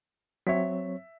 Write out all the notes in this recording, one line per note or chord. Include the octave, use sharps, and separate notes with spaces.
F#3 C4 C#5 E5 B6